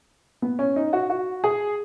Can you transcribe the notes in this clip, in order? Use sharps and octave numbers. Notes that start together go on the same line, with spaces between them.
B3
C#4
D#4
F#4
F#4
G#4